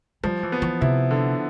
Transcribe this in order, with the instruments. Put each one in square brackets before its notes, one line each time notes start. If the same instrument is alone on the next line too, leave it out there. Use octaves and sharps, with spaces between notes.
[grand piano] F3 [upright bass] G3
[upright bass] E3
[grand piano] B3
[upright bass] E3
[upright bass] C3 [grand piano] E4
[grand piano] D3